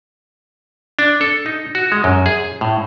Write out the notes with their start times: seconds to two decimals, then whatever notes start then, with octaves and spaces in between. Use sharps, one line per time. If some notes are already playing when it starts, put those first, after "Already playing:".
0.99 D4
1.21 A4
1.46 D#4
1.75 F#4
1.92 G#3
2.04 F#2
2.26 G#4
2.61 A2